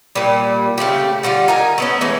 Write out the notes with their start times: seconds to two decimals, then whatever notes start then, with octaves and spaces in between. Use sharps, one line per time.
0.15 A#2 G3
0.78 C#3 A3 C4 G4
1.23 D3 G3 D4 F4
1.48 D#4 A#4 G#5
1.78 A3 B3 C#4
2.01 E3 G#3 C#4